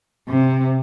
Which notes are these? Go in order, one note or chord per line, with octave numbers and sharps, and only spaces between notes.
C3